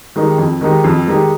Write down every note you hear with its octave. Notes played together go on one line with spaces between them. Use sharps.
D#3 G#3 D#4 G4
F2
D#3 G#3 D#4 G4
F2
D#3 G#3 D#4 G4